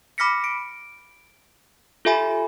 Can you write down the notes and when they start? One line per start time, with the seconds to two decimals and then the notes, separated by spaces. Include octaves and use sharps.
0.18 B5 D6 F6 A#6 B6 C#7
0.44 D7
2.05 F4 G4 A4 E5 G#5 B5